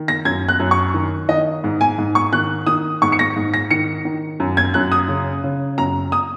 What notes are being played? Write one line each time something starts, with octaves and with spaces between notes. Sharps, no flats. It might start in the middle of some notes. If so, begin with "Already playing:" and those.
Already playing: D#3
A#6
F#2 G#6
F#6
F#2
C#6
D#3
D#3 D#5
G#2
G#5
G#2
C#6
D#3 F#6
D#3 D#6
G#2 C#6
C#7
A#6
G#2
A#6
D#3 C#7
D#3
F#2
G#6
F#2 F#6
D#6
C#3
C#3
F#2 A#5
D#6